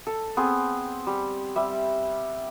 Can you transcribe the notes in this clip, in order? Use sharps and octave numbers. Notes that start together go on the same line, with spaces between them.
A4
B3 C4 G#4
G3
G3 E5